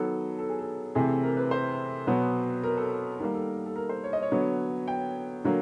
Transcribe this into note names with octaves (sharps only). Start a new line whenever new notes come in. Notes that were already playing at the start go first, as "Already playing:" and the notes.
Already playing: D#3 F#3 B3 A4
A4
G#4
A4
C3 E3 A3 C4 G#4
A4
A#4
B4
C5
B2 F#3 B3
A#4
A4
D#3 G3 A#3 A#4
A4
A4
A#4
C5
C#5
D#5
C#5
D3 F#3 B3
G5
D3 F#3 A#3